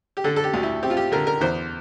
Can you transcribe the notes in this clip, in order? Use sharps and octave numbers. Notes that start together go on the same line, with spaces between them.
G4
D3 A4
A4
G4
D2
E4
C4 G4
F4
G4
D3 A#4
A#4
E2 C5